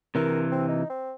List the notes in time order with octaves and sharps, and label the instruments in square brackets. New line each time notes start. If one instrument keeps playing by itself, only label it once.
[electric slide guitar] C3 E3 [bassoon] A#4
[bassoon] C4
D#4
C4